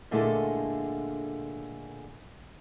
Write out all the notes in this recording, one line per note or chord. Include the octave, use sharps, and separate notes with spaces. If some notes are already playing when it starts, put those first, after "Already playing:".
A#2 D3 G#3 A3 E4 A4